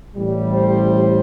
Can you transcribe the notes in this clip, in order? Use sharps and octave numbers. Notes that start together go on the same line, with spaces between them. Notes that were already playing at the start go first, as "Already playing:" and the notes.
A1 A2 G3
C5